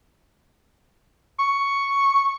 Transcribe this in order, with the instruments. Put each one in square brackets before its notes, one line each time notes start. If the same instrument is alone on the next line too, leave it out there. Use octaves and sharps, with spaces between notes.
[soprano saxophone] C#6